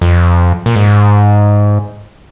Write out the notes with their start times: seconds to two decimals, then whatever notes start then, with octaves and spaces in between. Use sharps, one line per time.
0.01 F2
0.66 A#2
0.76 G#2